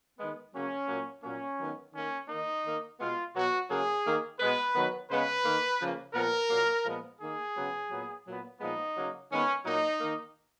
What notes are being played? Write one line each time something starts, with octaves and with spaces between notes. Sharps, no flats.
D#3 G#3 B3
C#3 F#3 A#3 C#4
A#2 F#3 A#3
A#2 F#3 A#3 C#4
D#3 F#3 B3
D#3 A#3 C#4
D#3 A#3 D#4
D#3 A#3
B2 G#3 B3 F4
B2 F#3 B3 F#4
C#3 F#3 A#3 G#4
D#3 A#3
B2 G#3 B3 B4
D#3 F#3 B3
C#3 G#3 B3 B4
D#3 A#3
C#3 F3 A#3
A#2 F3 B3 A#4
A#2 F#3 A#3
A#2 F3 G#3 B3
D#3 A#3 G#4
C#3 F#3 B3
A#2 F#3 B3
A#2 F#3 B3
A#2 F3 G#3 B3 D#4
C#3 F#3 A#3
D#3 G#3 B3 C#4
A#2 F#3 A#3 D#4
D#3 A#3